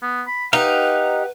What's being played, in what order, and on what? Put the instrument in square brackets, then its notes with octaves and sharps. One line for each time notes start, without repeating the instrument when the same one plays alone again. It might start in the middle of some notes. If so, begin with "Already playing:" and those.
[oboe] B3
B5
[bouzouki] D#4 [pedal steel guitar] G4 F5 [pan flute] B4 [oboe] F#5